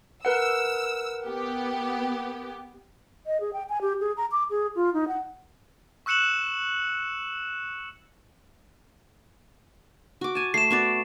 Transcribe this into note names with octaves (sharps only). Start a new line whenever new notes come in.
A#4 B4 F#5 E6
B3 G4
D#5
G#4
G5
G#5
G4
G#4
A#5
D6
G#4
F4
D#4
F#5
C#6 E6 F#6 C#7 E7 F#7
F#4 D6
G#5 A5
A3 C7 E7
B3 F#4 D5